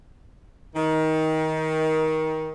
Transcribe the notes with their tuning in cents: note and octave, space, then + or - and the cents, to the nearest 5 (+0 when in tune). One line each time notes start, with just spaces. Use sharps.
D#3 +20